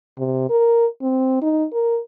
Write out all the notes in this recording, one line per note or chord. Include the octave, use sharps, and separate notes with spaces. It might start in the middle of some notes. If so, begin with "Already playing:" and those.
C3
A#4
C4
D#4
A#4